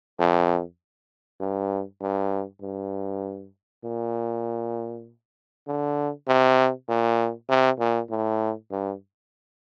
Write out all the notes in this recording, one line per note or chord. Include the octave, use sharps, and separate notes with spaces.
F2
G2
G2
G2
A#2
D3
C3
A#2
C3
A#2
A2
G2